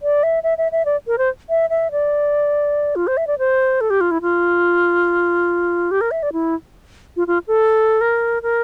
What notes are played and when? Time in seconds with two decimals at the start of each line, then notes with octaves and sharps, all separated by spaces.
0.02 D5
0.23 E5
0.43 E5
0.58 E5
0.72 E5
0.85 D5
1.07 A#4
1.18 C5
1.49 E5
1.70 E5
1.91 D5
2.96 F4
3.07 C5
3.17 E5
3.27 D5
3.39 C5
3.81 A4
3.90 G4
4.01 F4
4.11 E4
4.22 F4
5.91 G4
6.01 A#4
6.11 E5
6.23 D5
6.33 E4
7.17 F4
7.27 F4
7.48 A4
8.01 A#4
8.43 A#4